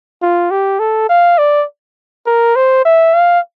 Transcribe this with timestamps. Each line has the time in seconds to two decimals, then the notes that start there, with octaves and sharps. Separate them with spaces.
0.22 F4
0.51 G4
0.80 A4
1.09 F5
1.38 D5
2.26 A#4
2.56 C5
2.85 E5
3.14 F5